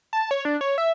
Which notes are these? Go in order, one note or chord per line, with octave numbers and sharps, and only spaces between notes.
A5
C#5
D4
C#5
E5